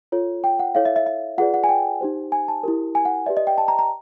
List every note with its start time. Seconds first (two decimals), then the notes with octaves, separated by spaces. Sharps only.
0.12 F4 A4 C#5
0.44 G5
0.59 F#5
0.75 E4 A4 C#5 F5
0.85 E5
0.96 E5
1.06 E5
1.38 F4 G#4 B4 D5 F#5
1.54 F#5
1.64 G#5
1.69 G5
2.01 D#4 G4 C5
2.32 G#5
2.48 A5
2.63 E4 G4 A#4
2.95 G#5
3.05 F#5
3.26 G4 B4 D5 E5
3.37 D#5
3.47 G5
3.58 A5
3.68 A#5
3.79 A#5